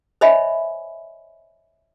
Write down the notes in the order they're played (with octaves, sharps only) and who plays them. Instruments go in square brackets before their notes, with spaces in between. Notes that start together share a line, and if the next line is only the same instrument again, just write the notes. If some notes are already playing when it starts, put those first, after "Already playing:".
[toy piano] C5 C#5 D#5 E5 G#5 B5